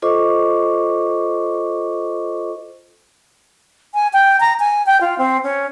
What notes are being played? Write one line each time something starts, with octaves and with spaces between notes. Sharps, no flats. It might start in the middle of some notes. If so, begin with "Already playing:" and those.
F4 A4 C5 D#5 C#6 D6
G#5
G5
A#5
G#5
G5
F4
C4
C#4